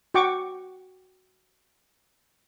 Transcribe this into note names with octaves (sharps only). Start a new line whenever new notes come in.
F#4 G5 C#6 D6